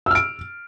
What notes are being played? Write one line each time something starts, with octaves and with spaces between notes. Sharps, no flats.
E6 F6 D7